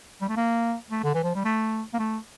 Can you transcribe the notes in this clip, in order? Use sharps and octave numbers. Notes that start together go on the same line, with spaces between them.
G3
A3
A#3
A3
D3
E3
F3
G3
A3
A#3
A3